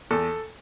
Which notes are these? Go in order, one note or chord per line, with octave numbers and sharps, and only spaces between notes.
E2 A4